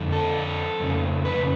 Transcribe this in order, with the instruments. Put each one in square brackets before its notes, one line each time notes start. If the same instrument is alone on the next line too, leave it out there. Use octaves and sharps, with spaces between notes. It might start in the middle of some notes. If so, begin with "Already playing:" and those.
Already playing: [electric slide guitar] F2 D3
A4
F2 C#3
B4